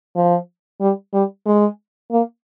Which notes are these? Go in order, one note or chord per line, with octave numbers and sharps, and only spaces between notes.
F3
G3
G3
G#3
A#3